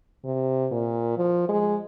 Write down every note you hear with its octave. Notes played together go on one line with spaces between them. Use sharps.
C3
A#2
F3
G#3